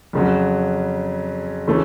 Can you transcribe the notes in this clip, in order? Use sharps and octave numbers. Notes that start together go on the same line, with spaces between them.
F2 C#3 F#3
C#3 E3 A3